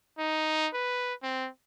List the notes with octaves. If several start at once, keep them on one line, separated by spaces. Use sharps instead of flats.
D#4
B4
C4